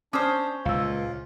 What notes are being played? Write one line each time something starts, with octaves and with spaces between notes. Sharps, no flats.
C#4 D4 C5 D6 D#6 F6
C#2 A#2 F4 F5 E6